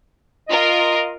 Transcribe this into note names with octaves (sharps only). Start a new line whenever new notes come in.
F4 A#4 D#5